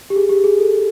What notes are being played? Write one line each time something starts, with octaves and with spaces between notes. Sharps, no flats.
G4
G#4
G4
G#4
A4